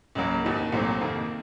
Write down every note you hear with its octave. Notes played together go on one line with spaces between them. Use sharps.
C#2 C#3 F#3 A#3
F1 D#2 D#3
C2 A#2 F#3 A3 C4
F2 D#3 A#3 D#4